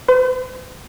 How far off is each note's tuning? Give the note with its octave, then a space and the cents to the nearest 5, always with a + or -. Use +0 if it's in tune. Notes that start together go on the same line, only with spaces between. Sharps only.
C5 -45